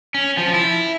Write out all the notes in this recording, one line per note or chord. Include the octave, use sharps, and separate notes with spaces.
C#4
F3
E4